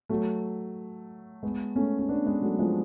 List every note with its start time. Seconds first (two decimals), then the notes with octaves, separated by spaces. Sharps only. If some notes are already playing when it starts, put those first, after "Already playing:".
0.09 F#3 A3
1.43 G#3 B3
1.76 A3 C#4
1.99 C#4
2.09 B3 D4
2.26 G#3 B3
2.42 F#3 A3
2.59 F3 G#3